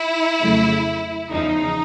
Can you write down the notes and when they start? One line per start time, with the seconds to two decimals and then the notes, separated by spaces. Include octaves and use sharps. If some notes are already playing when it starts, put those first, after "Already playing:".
Already playing: E4
0.40 F2 C#3 F#3 A3
1.30 E2 C#3 F3 D#4